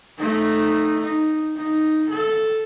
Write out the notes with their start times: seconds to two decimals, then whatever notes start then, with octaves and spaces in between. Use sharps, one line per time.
0.18 A3 D#4
1.00 D#4
1.56 D#4
2.09 A4